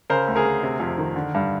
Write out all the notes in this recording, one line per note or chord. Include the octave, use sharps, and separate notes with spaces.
C#3 A#4 C5
D2
G#4 A#4
D2
C3
F2
D#3
D3
G2